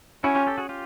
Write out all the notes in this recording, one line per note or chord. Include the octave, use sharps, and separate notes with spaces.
C#4 E4 F#4
F4 G4
G4 A4
F#4 G#4
F4 G4